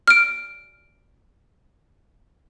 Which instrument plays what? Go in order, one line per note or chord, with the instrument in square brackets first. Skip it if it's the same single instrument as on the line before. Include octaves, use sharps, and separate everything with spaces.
[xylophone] F6 D7